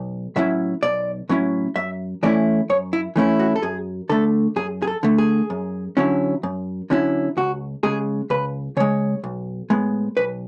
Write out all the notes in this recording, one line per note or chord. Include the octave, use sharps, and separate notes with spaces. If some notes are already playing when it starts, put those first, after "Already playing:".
Already playing: B1
A2 F#3 C#4 E4 E5
B1 D5
A2 F#3 C#4 E4
F#2 E5
E3 A3 C#4 E4 D5
F#2 C#5
E4
E3 A3 C#4 E4
F#4
A4
F#2 G#4
D3 A3 A4
F#2 G#4
G#4
A4
D3 A3
G#4
F#2
D3 F#3 C#4 E4
F#2
D3 F#3 C#4 E4
C#2 F#4
C#3 G#3 G#4
C#2 B4
C#3 G#3 C#5
B1
A2 G#3 B3
B1 B4